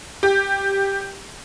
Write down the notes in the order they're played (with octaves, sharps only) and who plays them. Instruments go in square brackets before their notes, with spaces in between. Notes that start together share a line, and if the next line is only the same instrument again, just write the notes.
[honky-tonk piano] G4